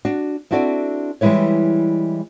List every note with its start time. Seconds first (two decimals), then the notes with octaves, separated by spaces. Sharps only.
0.05 D4 F#4
0.51 C4 D4 E4 F#4 A4 D5
1.21 E3 G3 G#3 E4 B4 C#5